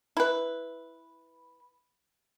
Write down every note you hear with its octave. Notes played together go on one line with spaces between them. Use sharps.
E4 B4